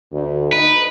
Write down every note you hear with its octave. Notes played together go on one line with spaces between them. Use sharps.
D2
D#4 B4